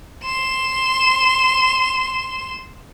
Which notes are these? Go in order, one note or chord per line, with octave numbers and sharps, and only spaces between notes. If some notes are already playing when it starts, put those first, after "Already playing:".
C6 E7